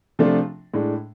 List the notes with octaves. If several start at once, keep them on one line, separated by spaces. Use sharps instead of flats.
C3 F3 A3 D4 F4
A2 G#3 D4